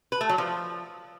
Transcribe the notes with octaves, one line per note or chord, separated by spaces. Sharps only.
B4
A3
F#3
F3